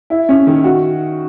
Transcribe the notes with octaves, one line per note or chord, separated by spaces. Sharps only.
E4
C#4
D#3
F#4